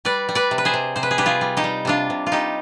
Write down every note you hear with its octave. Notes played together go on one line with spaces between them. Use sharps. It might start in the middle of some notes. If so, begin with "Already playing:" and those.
G3 B4 D5
G3
B4 D5
C3
B4
G#4 C5
C3
C3 C5
B4
G#4
G3 G4 B4
F4 G#4
G3
D#4 G4
G3
C3 D4 F4
C3
F4
G3 D#4 G4